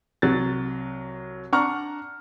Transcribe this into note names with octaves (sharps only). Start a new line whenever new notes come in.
C2 F#3 F#6 A6
D4 F#5 A#5 C#6 F6